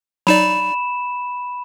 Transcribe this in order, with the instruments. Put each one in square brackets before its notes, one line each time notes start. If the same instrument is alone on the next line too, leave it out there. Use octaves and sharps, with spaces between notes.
[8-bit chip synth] F#3 D#4 D5 [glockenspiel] B5 E7